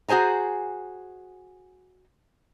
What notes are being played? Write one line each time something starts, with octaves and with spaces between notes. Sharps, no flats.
F#4 G#4 C5 G#5 A#5